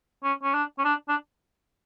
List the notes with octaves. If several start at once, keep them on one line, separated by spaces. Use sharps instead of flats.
C#4
C#4
D4
C#4
D4
D4